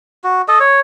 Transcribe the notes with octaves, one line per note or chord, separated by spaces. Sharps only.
F#4
A4 D#5
C#5